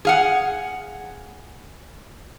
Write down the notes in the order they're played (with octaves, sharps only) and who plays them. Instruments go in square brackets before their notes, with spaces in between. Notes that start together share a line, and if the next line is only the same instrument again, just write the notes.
[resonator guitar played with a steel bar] G#4 F5 F#5